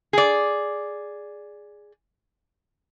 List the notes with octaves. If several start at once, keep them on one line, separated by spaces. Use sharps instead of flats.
G#4 D5